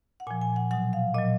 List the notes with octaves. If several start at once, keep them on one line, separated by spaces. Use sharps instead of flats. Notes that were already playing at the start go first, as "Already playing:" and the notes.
F#5
A#2 F3 G#5
G#5
F#5
B2 F#3 F#5
F5
A#2 F#3 D#5